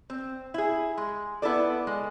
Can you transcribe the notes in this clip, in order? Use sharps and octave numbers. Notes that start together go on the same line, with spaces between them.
C4
E4 G#4
G#3
B3 E4 A4 D5
G#3